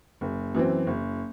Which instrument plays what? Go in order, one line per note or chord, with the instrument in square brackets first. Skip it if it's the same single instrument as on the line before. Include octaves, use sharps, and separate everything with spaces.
[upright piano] F#1
F#2 E3 C4
F#1